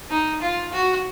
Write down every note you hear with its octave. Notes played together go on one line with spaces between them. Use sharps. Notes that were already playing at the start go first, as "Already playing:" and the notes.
D#4
F4
F#4